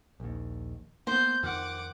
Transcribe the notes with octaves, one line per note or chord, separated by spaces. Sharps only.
A#1 D#2
A#3 B3 C5 G6
F2 D#3 F#5 D6